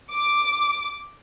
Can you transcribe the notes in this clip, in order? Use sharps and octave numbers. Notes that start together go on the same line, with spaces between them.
D6